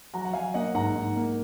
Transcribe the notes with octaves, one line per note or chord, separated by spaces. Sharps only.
F#3 F#5 A#5
F#5
F#3 F5 G#5
A#3 D#5 F#5
G#2 F#5 A#5
G#2
A#3